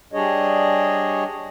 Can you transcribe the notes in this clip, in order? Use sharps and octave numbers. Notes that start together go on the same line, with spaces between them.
G3 D4 G#4 C#5 D#5